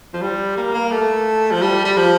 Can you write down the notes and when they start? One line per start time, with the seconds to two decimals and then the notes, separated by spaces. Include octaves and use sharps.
0.14 F3
0.21 G3
0.57 A#3
0.74 A#3
0.91 A3
1.51 F3
1.61 G3
1.85 G3
1.97 F3